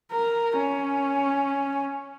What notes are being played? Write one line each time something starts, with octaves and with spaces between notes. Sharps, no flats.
A#4
C#4